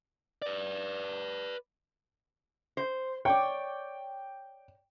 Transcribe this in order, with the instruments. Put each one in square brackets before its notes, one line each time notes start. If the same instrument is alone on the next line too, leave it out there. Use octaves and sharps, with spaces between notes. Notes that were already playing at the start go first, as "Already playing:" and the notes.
[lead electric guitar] B4 D5
[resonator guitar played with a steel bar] C5
[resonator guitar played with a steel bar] C#5 D5 [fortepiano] G5